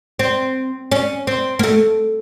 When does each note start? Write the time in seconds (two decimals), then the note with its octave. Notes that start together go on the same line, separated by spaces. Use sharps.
0.19 C4
0.91 C#4
1.27 C4
1.59 A#3
1.63 A3